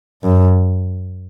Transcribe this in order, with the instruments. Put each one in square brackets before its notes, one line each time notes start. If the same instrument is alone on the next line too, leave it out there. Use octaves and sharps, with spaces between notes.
[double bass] F#2